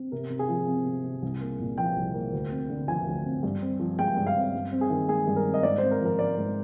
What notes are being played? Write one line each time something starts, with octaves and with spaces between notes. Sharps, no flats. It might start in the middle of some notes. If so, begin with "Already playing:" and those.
Already playing: C4
C3 A#4
C3
G#4
F3
C4
C3
C3
C2
A#3
A#2
F3 G5
C2
A#3
D2
C4
D3
F3 G#5
D2
C4
G2
C4
F3
G#3 G5
G2
F5
C4
G2
C4
G#4
D#3
G#3 G#4
G2
A#4
C4
D#5
G#2 D5
C4 C5
A#4
F3 A#4
G#3 D5
G#2